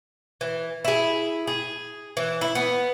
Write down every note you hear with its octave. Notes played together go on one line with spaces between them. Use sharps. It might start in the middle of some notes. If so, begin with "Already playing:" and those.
E3
E4 G#4
G#4
E3
E4
B3